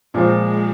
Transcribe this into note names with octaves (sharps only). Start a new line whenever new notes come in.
A#2 F3 G#3 C4